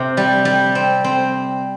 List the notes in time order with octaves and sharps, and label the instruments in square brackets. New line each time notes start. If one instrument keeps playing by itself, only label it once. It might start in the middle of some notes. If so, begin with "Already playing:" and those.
Already playing: [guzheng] C3
G3
G3
C4
C4